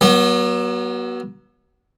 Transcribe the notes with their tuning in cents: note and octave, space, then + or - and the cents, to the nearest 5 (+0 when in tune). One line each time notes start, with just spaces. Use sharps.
F#3 +20 B3 -35